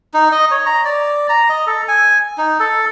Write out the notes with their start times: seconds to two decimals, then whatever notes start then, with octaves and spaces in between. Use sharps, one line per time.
0.14 D#4
0.32 D#5
0.51 C#5
0.66 A#5
0.85 D5
1.29 A#5
1.49 D#5
1.67 A4
1.88 G#5
2.38 D#4
2.60 A4